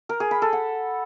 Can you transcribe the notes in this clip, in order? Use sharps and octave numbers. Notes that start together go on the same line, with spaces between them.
A#4
G#4
B5
A4
F#5